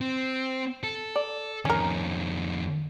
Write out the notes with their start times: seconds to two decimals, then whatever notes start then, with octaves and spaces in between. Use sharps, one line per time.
0.01 C4
0.83 A4
1.16 D5
1.65 F2 D#3 C#4 A#4